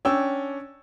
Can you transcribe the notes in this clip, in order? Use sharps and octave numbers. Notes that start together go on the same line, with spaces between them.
C#4 D4 G5 E6